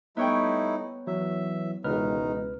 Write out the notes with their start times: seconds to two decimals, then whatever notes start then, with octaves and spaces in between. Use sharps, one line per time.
0.17 G3 A3 B3 D#4 E4 C#5 G5
1.07 E3 F#3 E5
1.84 E1 C#2 D#3 D#4 B4 F6